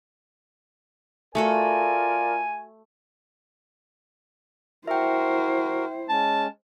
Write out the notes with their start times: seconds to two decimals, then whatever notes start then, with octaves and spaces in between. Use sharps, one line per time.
1.35 A3 F4 F#4 A4 A#4 D5 G#5
4.88 E4 F#4 A#4 C5 E5 G5
6.09 G#3 C#4 A5